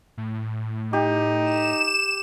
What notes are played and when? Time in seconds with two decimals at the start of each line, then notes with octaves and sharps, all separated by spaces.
0.18 A2
0.93 D#4 G4
1.44 E7